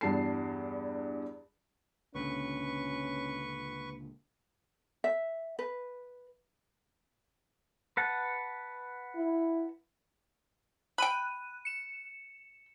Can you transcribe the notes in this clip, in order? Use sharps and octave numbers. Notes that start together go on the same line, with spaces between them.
E2 G2 D4 A5 C7
C#2 A#2 D3 C#4 B4 C#6
E5
B4
B4 F#5 A5
E4
G5 B5 F#6 D#7
C#7 E7